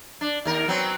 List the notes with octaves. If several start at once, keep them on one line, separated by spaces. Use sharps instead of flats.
D4
D#2 A#4
F#3 B3 C4